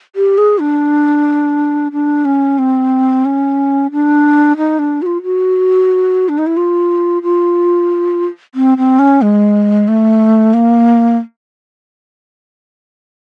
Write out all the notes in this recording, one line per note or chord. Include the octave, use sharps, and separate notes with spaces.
G4
G#4
D4
D4
C#4
C4
C#4
D4
D#4
D4
F#4
F4
F#4
D4
D#4
E4
F4
F4
C4
C4
C#4
G#3
A3
A#3